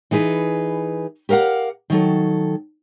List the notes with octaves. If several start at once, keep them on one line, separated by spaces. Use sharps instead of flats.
E3 D#4 G#4 B4
G4 A#4 D#5 F5 F#5
D#3 F#3 A4